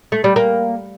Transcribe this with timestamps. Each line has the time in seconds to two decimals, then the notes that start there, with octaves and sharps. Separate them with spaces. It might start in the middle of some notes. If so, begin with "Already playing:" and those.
0.12 A3
0.24 G3
0.36 A#3